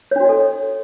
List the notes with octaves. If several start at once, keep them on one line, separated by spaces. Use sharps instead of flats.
D4 F#4 A4 C#5 D#5